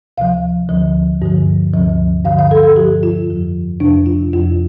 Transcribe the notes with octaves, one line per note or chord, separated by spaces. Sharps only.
D2 C3 F3 F5
D2 D3 F3
G2 D3 F3
D2 C3 F3
G2 D3 F3 F5
F5
A4
A4
G2 F3 G4
F4
F2 F3
F2 C3 F3 D4
F4
F2 F3 F4